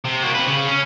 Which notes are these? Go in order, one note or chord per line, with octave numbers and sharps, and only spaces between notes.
C3
A#3 F#4
C4 B4
C#3
C#4